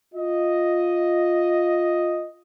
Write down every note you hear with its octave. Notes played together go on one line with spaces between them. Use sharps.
F4 D#5